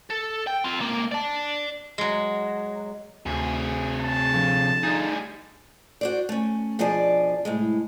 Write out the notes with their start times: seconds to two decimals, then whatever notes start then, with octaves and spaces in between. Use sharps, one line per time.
0.10 A4
0.47 G5
0.64 C4 F4
0.79 C#2 A#3
1.11 D5 A5
1.98 F#3 G#3
3.26 D2 C3 G#4
4.00 A5
4.33 D3 F3 F5
4.83 G3 D#4 G#4
6.01 F#4 C5 D5
6.29 A3 C#4
6.79 B2 F3 D4 G#4 D5 A5
7.45 A2 C3 G#3